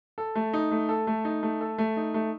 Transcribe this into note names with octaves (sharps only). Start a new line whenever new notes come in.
A4
A3
D#4
A3
A4
A3
D#4
A3
A4
A3
D#4
A3